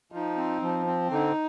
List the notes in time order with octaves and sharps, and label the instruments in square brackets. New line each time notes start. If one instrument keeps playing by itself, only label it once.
[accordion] F3 [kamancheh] D#4
[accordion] C4
F3
C4
[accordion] D3 [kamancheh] D#4